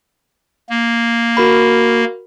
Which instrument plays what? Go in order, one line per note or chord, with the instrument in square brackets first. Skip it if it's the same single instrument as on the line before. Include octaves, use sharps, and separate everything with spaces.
[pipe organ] A#3
[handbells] F#4 A#4 B5